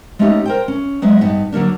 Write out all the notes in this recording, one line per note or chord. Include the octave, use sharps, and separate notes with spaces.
G#3 A3 B3 C#4 D#4 G4
A#4 C5 G5
C#4
F#3 G#3 B3 G#4 E5
G2 B3 D#4
D3 F#3 A#3 D4